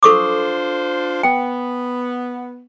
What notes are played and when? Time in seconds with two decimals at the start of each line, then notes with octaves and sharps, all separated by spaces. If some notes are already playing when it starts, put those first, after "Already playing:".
0.03 D4 F4 A4 C5 C#6 D6
1.23 B3 G5